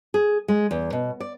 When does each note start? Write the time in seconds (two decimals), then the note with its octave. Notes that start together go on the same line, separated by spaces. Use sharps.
0.14 G#4
0.48 G#3
0.71 E2
0.93 B2
1.20 D5